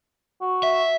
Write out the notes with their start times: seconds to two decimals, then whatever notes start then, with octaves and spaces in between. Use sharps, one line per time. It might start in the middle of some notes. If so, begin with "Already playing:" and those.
0.41 F#4
0.63 E5